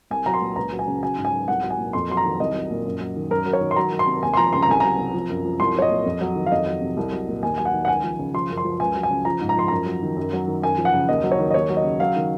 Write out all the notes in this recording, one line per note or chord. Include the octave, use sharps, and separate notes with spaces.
C2 G#5
F#3 A#5
C6
A#2
C#2 A#5
F#3
G#5
C#3
F#3 G#5
G#2
G#5
F#3
C2 F#5
F#3
G#5
A#2
F2 C6
F#3 C6
A#5
D#3
C2 D#5
F#3
A#2
F#2
F#3
D#3
F#2 A#4
F#3
C#5
D#3
C6
F#3 A#5
D#3
C6
C3
D#2 G#5
C6
F3 A#5
C#3 C6
A#5
C2 G#5
F#3 A#5
C3
F3
F#2
F3
C2 C6
F#3 C#5
D#5
A#2
F2
F#3
D#3
F5
F2 D#5
F#3
C3
C2
F#3
A#2
D#2 G#5
F#3 G#5
F#5
D#3
F#5
C#2 G#5
F3
C#3
F3 C6
F#2
C6
F3
C#2 G#5
F#3
G#5
C#3
F3 A#5
G#2
A#5
F3 C6
F#2 A#5
F#3
D#3
F#2
F#3
D#3
F#2 G#5
F3
F#5
C#3
D#2 D#5
F#3
C#5
D#3
D#5
D#2 C#5
F#3
D#5
C#3
F#3 F5
D#3